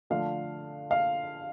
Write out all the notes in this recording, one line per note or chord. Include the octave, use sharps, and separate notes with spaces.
D3 F3 A3 D4 F5
F5